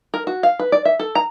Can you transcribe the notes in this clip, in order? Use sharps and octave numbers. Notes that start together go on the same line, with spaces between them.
A#4
F#4
F5
B4
D5
E5
A4
A#5